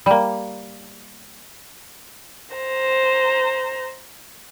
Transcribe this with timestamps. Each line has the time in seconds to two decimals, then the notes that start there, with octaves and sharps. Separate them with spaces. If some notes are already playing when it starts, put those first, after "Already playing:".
0.06 G3 A#3
2.55 C5 A#5